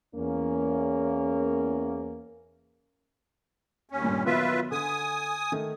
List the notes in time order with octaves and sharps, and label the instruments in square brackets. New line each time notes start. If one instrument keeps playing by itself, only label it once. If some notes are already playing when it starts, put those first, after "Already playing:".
[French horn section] E2 A#3 C#4
[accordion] D#2 C#4
[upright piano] G2 A#2 G3
[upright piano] D#3 F#3 B3 [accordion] F4 B4 E5
[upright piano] D3 [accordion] G#5 D#6
[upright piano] D#3 A3